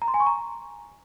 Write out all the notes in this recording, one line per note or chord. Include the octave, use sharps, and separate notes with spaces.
A#5
C6
G#5
C#6
A#5